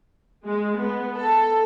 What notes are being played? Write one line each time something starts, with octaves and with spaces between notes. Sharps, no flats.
G#3
B3
A4